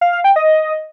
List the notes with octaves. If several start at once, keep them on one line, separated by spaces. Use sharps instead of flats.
F5
F5
G5
D#5